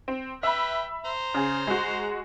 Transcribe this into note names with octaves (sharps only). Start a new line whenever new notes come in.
C4
B4 E5 G5 B5
C5 A#5 C6
C#3 G#4
G#3 F#4